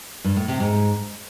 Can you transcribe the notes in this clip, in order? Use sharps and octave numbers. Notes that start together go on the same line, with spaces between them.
G2
A2
C3
G#2